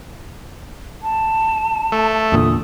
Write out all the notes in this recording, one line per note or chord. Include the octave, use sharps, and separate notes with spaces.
A5
A3
E2 A#2 D3 D#6